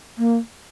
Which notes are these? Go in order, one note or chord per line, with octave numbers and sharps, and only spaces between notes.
A#3